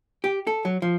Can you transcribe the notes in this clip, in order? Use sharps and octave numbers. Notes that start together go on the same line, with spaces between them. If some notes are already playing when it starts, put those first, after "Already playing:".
G4
A4
F#3
F3